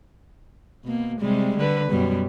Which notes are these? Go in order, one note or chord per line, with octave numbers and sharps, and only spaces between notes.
B2 A#3
C3 G3 G#3
D3 B4
F#2 B2 G3